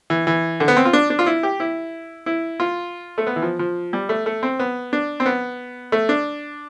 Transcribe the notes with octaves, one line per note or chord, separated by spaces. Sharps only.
E3
E3
D3
B3
C4
F4
D4
D4
F4
E4
G4
E4
E4
F4
A3
B3
E3
F3
F3
G3
A3
A3
C4
B3
D4
C4
B3
A3
D4